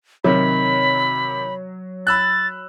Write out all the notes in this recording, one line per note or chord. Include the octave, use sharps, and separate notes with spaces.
C3 D#3 F#3 B5
B5 E6 F#6 A6